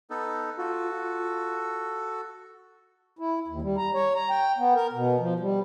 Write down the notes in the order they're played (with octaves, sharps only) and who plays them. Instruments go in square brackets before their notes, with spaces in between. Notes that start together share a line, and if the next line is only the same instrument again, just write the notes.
[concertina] B3 D#4 A4
[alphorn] F4 [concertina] F#4 A4
[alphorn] F4
[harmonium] E4
D#2
G3
A#5
C#5
A#5
G5
B3
A#4
B2
F3
G3